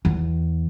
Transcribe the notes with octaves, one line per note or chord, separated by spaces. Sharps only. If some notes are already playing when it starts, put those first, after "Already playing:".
E2